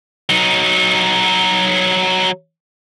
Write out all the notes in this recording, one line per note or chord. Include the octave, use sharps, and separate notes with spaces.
F#3 D#4